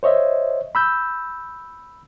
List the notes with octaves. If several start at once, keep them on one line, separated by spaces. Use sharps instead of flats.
C5 C#5 D#5 E5
B5 E6 G6